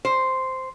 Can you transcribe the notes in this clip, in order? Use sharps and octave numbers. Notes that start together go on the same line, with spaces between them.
C5